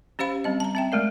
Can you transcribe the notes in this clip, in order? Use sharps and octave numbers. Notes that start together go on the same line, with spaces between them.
C#4 G4 C5 F5 B5
G3 C4 D#5
A5 A#5
C4 E5 G5
G#3 A3 A#4 D5